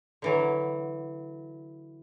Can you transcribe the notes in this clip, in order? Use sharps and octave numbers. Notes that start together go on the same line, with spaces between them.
D3 E3 F#3